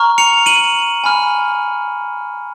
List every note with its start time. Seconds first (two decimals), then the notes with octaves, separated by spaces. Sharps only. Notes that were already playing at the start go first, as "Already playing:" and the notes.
Already playing: A#5 C#6 F6
0.18 C#7 F7
0.46 D#7 F#7
1.04 G#5 B5 F6